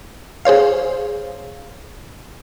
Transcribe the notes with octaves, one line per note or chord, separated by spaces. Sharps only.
G#4 C5 C#5 F5